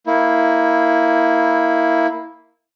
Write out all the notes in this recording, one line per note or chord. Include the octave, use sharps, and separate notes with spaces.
A#3 E4